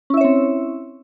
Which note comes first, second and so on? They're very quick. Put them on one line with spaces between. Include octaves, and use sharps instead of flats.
C#4 E4 E5 C#5 C4